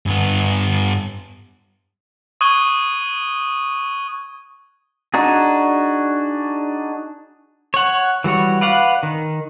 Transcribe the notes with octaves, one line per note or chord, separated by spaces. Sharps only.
G2 B3
C#6 D#6 F#6 G#6 D#7 G7
D4 D#4 F#4 G#4
C#5 F#5
E3 G3 F#4 C#5
B4 D5 F5 F#5
D#3